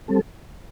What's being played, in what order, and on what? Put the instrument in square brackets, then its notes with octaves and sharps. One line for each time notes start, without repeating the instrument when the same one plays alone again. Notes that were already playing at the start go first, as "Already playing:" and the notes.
[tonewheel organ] G3 C4 A4